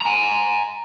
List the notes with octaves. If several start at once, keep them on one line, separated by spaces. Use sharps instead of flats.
G#5 A#5